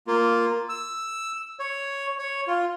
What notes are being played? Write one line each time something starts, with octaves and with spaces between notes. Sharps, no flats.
A#3 F4
E6
C#5
C#5
F4